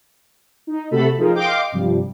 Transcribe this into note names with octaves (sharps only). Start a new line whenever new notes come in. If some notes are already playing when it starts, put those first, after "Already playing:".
D#4
C3 A3 F#4 A4 B5
F3 D#4 F4 G#4 A#4 C5
D#5 F5 G5 C6 D6
G2 C3 F3 G3